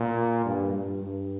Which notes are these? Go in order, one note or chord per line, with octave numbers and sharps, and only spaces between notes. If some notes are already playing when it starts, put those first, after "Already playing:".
Already playing: A#2
G2
G2
G2